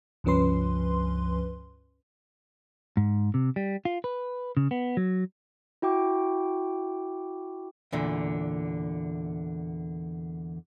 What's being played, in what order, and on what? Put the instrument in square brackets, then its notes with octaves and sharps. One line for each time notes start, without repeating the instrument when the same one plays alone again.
[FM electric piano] C#2 G2 F3 C#4 B4 C6
[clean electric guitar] G#2
C3
G3
F4
B4
C#3
B3
F#3
[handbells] E4 F#4 G5 D6
[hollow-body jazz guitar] E2 A#2 D3